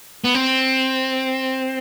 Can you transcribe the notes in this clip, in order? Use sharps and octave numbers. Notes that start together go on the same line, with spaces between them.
B3
C4